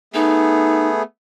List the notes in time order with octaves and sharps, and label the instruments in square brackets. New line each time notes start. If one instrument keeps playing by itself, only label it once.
[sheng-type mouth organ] A3 B3 G#4 [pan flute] D#4